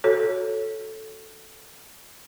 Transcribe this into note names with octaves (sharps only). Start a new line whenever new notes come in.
F#4 A4 C#5